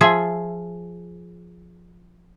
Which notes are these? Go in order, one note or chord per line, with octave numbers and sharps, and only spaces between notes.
F3 F4 G#4 E5